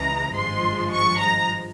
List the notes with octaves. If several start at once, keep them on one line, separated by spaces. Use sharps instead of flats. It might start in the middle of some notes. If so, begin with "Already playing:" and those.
Already playing: C#2 C#3 E3 G#3 A#5
G#1 G2 F3 G#3 C6
C#6
A#5